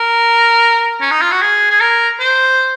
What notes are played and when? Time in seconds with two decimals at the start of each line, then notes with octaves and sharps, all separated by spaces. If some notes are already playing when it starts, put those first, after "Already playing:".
Already playing: A#4
1.01 C#4
1.11 D#4
1.22 F4
1.32 F#4
1.42 G#4
1.70 G#4
1.81 A#4
2.20 C5